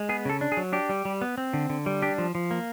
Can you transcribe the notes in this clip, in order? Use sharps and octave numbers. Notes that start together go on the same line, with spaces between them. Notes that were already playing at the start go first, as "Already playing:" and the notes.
Already playing: G#3
B3 G#4
C#3 A4
D4
G#4
F#3
D4 G4
G3
G3
B3
C4
D3
D3
G3
D4 G4
F3
F3
A#3